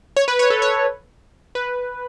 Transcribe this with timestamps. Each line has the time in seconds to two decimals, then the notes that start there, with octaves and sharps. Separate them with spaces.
0.17 C#5
0.28 B4
0.39 C#5
0.50 A4
0.62 C#5
1.55 B4